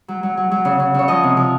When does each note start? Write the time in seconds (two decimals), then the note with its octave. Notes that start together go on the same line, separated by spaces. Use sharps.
0.08 F#3
0.23 F#3
0.37 F#3
0.51 F#3
0.65 C#3
0.80 C#3
0.94 C#3 C#5
1.08 F3 D#5
1.23 C3
1.37 F3